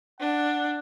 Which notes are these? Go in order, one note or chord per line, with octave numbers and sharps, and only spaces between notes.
D4 F#5